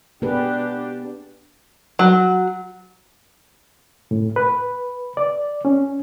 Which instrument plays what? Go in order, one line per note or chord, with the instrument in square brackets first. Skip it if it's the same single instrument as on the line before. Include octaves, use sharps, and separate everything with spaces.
[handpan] B3 G#4 B4 [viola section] D4 G4
[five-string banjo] F#3
[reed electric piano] A2
B4
D5
C#4